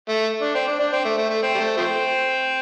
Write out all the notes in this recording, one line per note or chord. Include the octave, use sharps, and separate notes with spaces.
A3
D4
C4
D4
D4
C4
A3
A3
A3
C4
G3
A3
F3 A3 C4